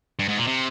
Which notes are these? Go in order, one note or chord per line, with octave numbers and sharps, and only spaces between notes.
G2
G#2
A#2
C3